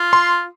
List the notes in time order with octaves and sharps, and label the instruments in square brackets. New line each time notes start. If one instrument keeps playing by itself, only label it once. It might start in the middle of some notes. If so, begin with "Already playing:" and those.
Already playing: [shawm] F4
[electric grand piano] C6